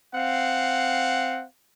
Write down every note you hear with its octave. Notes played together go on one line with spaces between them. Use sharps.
C4 F5 F#5